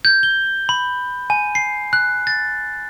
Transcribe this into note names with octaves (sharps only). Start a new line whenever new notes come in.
G6
G7
B5
G#5
C7
F#6
A6